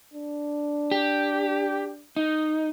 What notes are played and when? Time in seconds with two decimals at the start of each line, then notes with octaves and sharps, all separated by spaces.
0.14 D4
0.91 G4
2.16 D#4